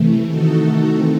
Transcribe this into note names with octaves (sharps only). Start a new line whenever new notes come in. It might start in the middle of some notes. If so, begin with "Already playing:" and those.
Already playing: C3 E3 A3
D#3 A3 D#4 F#4 A4
E3 C4